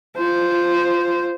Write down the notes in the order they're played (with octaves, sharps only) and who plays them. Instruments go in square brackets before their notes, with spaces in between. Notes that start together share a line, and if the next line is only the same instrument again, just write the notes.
[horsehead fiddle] F4 C5